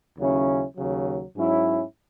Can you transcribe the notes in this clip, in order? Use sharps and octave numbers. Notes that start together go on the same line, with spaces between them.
D#2 C#3 F#3 C#4 E4
D#2 C#3 F#3
G#2 F#3 C#4 E4